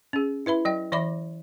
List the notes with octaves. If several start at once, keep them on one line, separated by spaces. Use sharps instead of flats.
C#4 G#4
E4 B4 E5 B5
F#3 D#5 G5
E3 D5 E5 B5 D6